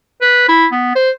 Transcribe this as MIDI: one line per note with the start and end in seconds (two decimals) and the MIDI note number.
0.22 0.48 71
0.49 0.66 64
0.72 0.92 59
0.95 1.11 72